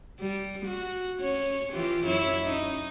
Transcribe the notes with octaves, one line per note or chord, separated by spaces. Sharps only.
G3
F#4
C#4 C#5
E3 F4 G4
F#2 E4 C#5
C#4 D#4